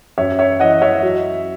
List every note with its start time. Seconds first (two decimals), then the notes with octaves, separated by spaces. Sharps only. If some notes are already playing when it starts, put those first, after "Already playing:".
0.18 F#2 C#5 E5
0.39 C#5 E5
0.60 E3 D#5 F#5
0.82 C#5 E5
1.03 F#3